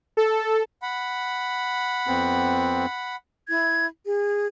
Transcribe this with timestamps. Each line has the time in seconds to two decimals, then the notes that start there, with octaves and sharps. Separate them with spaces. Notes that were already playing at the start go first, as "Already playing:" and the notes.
0.17 A4
0.82 F#5 B5
2.07 F2 B3 C4
3.48 E4 G#6
4.05 G#4